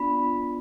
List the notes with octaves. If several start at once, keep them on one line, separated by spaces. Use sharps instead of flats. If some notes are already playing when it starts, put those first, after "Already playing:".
Already playing: B3 D4 F4 B5